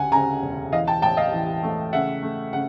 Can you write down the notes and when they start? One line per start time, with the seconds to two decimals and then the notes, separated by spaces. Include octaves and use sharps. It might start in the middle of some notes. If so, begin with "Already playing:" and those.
Already playing: D2 C#3 F#5 G#5
0.11 C#3 G#5 A#5
0.42 E1
0.72 E3 D#5 F5
0.87 G5 A5
1.02 A1 G5 A5
1.17 D#5 F5
1.33 E3
1.63 A3
1.93 C#3 E5 F#5
2.22 A3
2.53 C#3 F#5